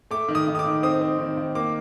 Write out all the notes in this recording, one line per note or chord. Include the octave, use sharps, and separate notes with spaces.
A3 D6
D#3
D#6
D#3
D#6
D6
D#3
C4 D#6
C4
D#3
D#3
A#3 D6